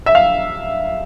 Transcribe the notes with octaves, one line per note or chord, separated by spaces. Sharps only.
E5
F5